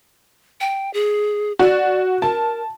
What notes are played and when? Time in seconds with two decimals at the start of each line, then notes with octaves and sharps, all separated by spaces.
0.60 G5
0.94 G#4
1.59 F#4 D5
2.22 A#4 A5